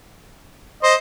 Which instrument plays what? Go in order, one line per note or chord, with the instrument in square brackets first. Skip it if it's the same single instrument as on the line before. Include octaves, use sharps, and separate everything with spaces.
[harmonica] C5 D#5